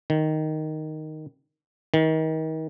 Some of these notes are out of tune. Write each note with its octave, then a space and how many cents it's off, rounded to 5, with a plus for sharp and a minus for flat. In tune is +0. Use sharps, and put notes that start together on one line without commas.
D#3 +0
D#3 +35